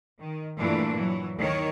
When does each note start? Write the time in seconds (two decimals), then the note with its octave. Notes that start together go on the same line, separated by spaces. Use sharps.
0.21 D#3
0.58 G2 A#2 E3 A3 D4
0.97 E3 F#3
1.36 D#2 D#3 C#5